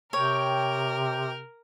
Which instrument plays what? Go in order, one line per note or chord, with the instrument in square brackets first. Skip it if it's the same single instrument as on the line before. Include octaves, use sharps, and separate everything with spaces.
[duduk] C3 [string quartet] A#4 [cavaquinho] C#5 [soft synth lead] G5